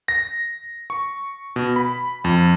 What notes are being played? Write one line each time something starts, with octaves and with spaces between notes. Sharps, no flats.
A#6
C#6
B2
B5
F2